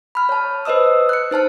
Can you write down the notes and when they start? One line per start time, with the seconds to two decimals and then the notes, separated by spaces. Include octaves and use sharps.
0.15 B5 F6
0.29 C#5 A5
0.65 B4 C5 D#5 D#6 E6
1.09 F#6 C#7
1.31 D#4 C5 A5 F6